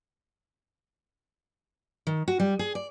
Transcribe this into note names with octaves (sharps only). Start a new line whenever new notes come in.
D#3
F#4
G3
G#4
D5